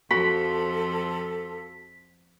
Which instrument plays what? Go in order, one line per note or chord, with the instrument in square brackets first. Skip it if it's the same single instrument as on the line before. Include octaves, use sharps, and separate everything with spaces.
[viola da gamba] F2 F3 F4 [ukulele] F#4 B5 [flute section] A4 [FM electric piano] B6